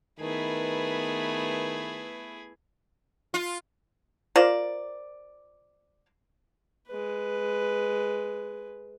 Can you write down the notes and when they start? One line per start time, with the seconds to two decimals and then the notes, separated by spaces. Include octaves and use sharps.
0.20 D#3 A3 B3 E4 G#4 B4
3.34 F4
4.36 F4 A#4 C5 D5
6.88 G#3 B4